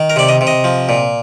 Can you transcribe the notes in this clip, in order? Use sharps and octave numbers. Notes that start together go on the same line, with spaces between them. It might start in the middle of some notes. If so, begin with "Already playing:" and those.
Already playing: D#3
A#4
C3 D5
D#5
C3
D#5
F3
A#2